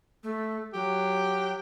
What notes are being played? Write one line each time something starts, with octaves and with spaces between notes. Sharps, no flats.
A3
F#3 G4